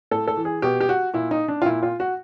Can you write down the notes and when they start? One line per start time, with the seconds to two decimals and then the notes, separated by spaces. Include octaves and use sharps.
0.11 A2 A4
0.28 A4
0.37 E3
0.45 G#4
0.62 B2 G4
0.80 G4
0.89 F#4
1.14 A#2 E4
1.31 D#4
1.48 D4
1.62 F4
1.66 A#2 E4
1.83 F4
2.00 F#4